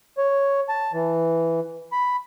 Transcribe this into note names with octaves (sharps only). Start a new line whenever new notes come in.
C#5
A5
E3
B5